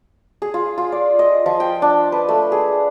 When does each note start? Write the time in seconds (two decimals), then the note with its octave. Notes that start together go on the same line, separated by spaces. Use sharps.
0.42 G#4
0.54 F4
0.78 F4
0.92 D5
1.19 D#5
1.46 F3
1.60 G5
1.82 D4
2.12 B4
2.29 A3
2.52 G#4